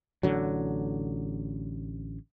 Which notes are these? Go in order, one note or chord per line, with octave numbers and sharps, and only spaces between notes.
A1 D3 F#3